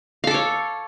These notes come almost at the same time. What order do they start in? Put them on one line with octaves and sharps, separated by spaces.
F5 A4 D6 C#5